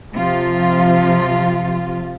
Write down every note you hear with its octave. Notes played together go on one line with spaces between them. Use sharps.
C3 F3 F4